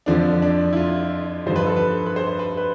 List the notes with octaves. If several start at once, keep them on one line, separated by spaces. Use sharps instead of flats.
F2 D3 F3 D4
D4
E4
F4
G2 D3 F3 C5
B4
A4
B4
B4
C5
B4
B4